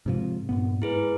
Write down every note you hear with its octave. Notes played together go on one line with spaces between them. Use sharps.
G#2 C3 F3
G2 A#2 B3
G#2 E4 G#4 B4